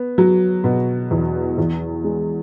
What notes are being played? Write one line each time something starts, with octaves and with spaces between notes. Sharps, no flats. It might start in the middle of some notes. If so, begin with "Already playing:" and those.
Already playing: B3
F#3
B2
E2
E2
G#3